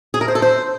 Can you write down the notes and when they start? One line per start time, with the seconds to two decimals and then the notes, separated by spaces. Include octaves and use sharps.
0.14 G#4
0.21 A#4
0.28 C5
0.35 A4
0.42 C5